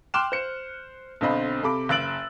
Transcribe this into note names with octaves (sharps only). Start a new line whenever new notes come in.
G5 C6 D6 F6 F#6 E7
C5 C#7
B1 D3 C4 D#5 B5
C3 A4 B5 D6
F#1 E6 F#6 A6 D7 F#7